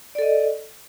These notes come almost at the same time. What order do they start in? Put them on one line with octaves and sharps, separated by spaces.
D5 A4 D#5